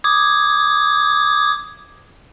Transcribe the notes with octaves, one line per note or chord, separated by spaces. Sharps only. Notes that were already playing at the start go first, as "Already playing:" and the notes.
D6 D#6 G#6